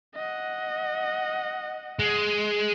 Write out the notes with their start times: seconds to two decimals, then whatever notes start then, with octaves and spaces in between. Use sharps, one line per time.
0.15 D#5 F#5
1.99 G#3